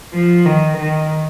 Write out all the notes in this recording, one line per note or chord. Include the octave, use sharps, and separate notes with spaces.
F3
D#3
D#3